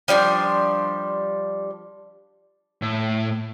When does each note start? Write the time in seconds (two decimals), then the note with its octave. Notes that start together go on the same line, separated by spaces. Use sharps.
0.08 F3 G3 D4 C5
2.82 A2